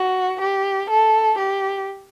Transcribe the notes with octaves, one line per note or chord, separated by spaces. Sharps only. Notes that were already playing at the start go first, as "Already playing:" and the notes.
Already playing: F#4
G4
A4
G4